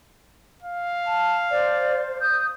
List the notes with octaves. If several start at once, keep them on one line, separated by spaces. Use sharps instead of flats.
F5
A5
C5 D5
D#6 G6